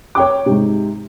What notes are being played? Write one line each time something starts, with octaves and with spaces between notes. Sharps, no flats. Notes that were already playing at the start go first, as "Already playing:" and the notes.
C#5 G5 D6
G#2 C3